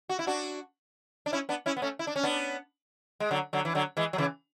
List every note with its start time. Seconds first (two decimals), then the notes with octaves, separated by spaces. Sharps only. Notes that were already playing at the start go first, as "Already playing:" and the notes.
0.09 F#4
0.19 E4
0.27 D4 F#4
1.26 D4
1.33 C#4 E4
1.49 B3 D4
1.66 C#4 E4
1.77 B3
1.82 A3 C#4
1.99 E4
2.07 D4
2.16 C#4
2.23 B3 D4
3.20 G#3
3.31 D3 F#3
3.53 D3 F#3
3.65 E3
3.75 D3 F#3
3.97 E3 G#3
4.13 F#3
4.18 C#3 E3